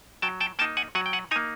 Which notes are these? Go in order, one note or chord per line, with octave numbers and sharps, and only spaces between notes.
F#3 G5 A5
G5 A5
A#3 D#4 G5 A5
F#5 G#5
F#3 F#5 G#5
G5
F#5 G#5
A#3 D#4 G#5 A#5